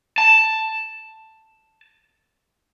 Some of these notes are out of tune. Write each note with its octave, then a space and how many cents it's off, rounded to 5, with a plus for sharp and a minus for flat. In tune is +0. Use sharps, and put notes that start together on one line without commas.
A5 +5